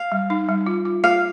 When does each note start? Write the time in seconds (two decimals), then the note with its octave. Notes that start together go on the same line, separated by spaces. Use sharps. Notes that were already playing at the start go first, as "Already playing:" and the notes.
Already playing: F5
0.12 G3
0.30 D#4
0.49 G3
0.67 F4
0.85 F4
1.04 F4 F5